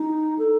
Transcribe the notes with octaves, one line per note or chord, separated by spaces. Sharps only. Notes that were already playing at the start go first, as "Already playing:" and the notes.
Already playing: D#4
A4